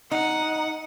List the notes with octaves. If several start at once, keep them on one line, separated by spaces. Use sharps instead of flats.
D#4 F#5